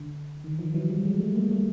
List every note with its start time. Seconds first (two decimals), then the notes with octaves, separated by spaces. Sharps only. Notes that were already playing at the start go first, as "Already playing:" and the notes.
Already playing: D3
0.44 D#3
0.59 D#3 F3
0.74 E3 F#3
0.90 F3 G3
1.05 F#3 G#3
1.20 G3 A3
1.36 G#3 A#3
1.51 G3 A3